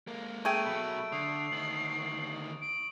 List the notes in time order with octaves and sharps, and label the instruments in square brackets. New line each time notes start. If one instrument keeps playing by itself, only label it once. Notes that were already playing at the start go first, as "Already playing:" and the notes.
[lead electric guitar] G#3 A#3
[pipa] A3 G#4 G5 [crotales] C#6 D7 [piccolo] D#7
[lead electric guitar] B2 F#3 [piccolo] B5
[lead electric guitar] D3 [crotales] D#6 [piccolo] C7
[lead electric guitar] D2 D#3 [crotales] F#7
[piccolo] D7